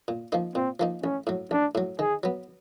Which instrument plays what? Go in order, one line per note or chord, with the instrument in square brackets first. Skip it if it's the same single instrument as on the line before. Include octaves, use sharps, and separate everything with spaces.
[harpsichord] A#2
F3 A#3 D#4
[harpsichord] A#2 [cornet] C4
[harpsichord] F3 A#3 D#4
[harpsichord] A1 [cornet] C#4
[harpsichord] A2 F#3
[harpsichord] A1 [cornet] D4
[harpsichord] A2 F#3
[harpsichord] D#3 [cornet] G#4
[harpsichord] F#3 B3